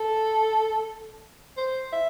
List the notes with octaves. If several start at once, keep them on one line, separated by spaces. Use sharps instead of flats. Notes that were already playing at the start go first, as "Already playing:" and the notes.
Already playing: A4
C5
E5